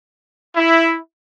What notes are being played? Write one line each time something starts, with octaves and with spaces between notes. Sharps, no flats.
E4